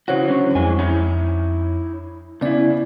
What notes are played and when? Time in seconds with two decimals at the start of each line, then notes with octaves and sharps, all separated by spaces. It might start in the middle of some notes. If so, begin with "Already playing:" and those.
0.08 C#3 E3 F#4 C5 C#5 F#5
0.26 D3 F#3 C#4
0.55 F2 E3 G#3 G#5
0.79 D#4 E4 C#5
2.41 C#3 B3 E4 D5